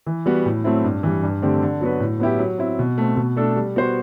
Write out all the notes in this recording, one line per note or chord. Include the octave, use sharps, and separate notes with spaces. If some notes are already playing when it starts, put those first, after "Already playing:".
E3
G3 B3 F#4
A2
F#3 A3 C4 E4
G2
E3 G3
G2
D3 A3 C4 G4
D3
F#3 B3 F#4 B4
A2
F#3 B3 E4 G4
F#3
C4 E4
B2
A3 C4
B2
A3 D4 A4
G3
B3 F#4 C5